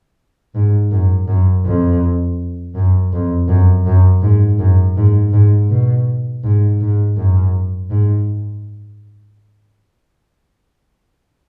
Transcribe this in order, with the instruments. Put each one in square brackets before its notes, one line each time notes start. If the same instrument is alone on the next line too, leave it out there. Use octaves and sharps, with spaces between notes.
[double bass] G#2
F#2
F#2
F2
F#2
F2
F#2
F#2
G#2
F#2
G#2
G#2
B2
G#2
G#2
F#2
G#2